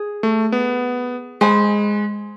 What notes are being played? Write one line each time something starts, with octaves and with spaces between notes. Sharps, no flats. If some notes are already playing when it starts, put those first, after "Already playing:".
Already playing: G#4
A3
B3
G#3 C5 G#5 B5